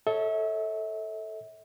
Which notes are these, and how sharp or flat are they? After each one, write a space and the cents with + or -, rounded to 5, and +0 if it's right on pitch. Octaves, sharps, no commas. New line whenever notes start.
A4 +0 C#5 +0 E5 -35